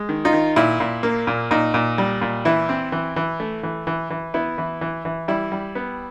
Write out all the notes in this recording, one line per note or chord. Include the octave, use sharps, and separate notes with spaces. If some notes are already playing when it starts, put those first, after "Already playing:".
Already playing: G#3
D#3
D#4 F4
D#3
A#2 E4
A#2
A#3
A#2
A#2 D#4
A#2
G3
A#2
E3 E4
C4
E3
E3
A3
E3
E3
E3
B3 E4
E3
E3
E3
G3 E4
G3
B3